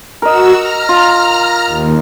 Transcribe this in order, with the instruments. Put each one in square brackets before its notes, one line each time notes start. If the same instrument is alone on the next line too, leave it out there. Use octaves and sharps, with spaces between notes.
[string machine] F#4 E6 [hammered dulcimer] A#4 D#5
[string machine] A#5 F6
[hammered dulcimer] F4
[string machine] D#2